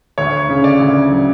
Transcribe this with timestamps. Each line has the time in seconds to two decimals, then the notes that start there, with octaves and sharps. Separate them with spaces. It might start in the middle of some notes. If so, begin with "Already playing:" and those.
0.18 D2 C#5
0.49 C#3
0.64 D5
0.80 D2
1.11 F#3